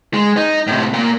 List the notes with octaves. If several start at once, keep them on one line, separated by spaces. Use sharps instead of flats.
G#3
D#4
A2 C3
A#2 A#3